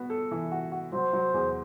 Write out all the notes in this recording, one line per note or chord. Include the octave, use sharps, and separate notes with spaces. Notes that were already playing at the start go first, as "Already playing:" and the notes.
Already playing: B3 F#4
A4
E3
F#4
F#4
F#3 C5
F#3
E2